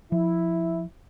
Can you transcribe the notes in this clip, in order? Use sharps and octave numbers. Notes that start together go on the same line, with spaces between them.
F3 E4